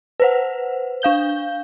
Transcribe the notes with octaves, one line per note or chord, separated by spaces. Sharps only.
B4 C5 F#5
D4 F5 G6 G7